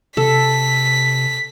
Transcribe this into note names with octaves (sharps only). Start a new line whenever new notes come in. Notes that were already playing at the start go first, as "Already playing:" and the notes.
C3 A4 B6